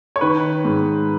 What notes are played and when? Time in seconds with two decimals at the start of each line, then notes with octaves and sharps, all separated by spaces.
0.16 C#5
0.21 D#3 B4
0.65 G#2